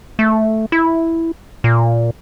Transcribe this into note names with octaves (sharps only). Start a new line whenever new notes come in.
A3
E4
A#2